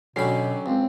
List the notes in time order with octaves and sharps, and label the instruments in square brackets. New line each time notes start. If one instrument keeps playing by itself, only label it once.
[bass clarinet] B2 [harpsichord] D3 B5 [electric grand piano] F#3 G4 [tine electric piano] C#4 C7
[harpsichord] C#2 [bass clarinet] C4